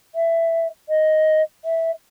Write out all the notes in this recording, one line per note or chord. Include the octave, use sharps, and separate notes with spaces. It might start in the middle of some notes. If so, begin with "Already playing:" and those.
E5
D#5
E5